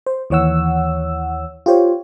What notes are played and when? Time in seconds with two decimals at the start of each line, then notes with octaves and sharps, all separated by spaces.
0.06 C5
0.30 D#2 E3 C#5 F#5 E6
1.66 F4 G4 C5 C#5